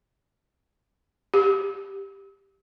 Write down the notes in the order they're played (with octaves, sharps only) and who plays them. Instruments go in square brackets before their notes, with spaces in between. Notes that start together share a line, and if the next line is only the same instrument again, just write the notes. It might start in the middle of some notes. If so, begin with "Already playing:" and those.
[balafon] G4